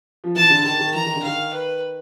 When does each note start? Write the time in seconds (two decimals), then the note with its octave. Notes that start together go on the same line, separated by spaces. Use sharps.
0.24 F3
0.35 E3 A5
0.50 D3
0.64 D#3 A5
0.79 D#3
0.94 E3 A#5
1.05 D#3
1.16 D3
1.23 D#3 F5
1.53 B4